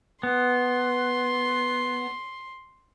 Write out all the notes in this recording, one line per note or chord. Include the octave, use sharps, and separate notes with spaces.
B3 C6